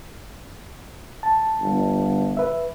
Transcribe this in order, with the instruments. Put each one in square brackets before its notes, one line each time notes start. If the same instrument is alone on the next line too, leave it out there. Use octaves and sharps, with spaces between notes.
[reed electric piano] A5
[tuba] G1
[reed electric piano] B4 E5